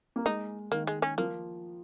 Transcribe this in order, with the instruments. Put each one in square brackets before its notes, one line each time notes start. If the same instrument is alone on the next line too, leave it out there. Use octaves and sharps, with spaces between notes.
[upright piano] A#3
[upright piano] G#3 [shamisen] D#4
[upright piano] D#3 [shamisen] A#3
[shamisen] G#3
C#4
[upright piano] F3 [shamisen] A#3